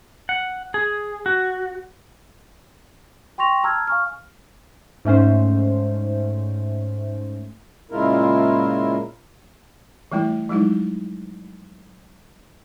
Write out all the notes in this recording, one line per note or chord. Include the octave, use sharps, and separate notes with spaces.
F#5
G#4
F#4
G5 C6 C#6 A#6 F7
A5 A#5 E6 F6 G#6
F5 G#5 C#6 F6
G#2 A3 C#4 C5
A#2 C#3 G#3 E4 F4 A#4
E3 G3 A3 E4
F3 F#3 G#3 D#4 E4